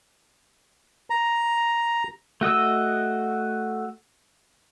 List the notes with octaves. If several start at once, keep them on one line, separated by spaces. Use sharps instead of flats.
A#5
A3 F#4 D#5 E6